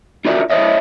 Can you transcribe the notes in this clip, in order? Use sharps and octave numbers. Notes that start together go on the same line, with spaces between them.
D4 F4 F#4 A#4 D5 E5
E4 C5 C#5 D#5 E5